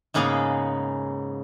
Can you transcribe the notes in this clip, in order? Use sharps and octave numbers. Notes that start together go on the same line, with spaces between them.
G#2 C#3 A#3 B3 G#4 F5